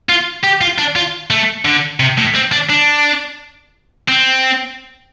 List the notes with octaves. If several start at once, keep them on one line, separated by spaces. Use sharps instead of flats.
F4
G4
F4
D4
F4
A3
D3
C3
A2
C4
D4
D4
C4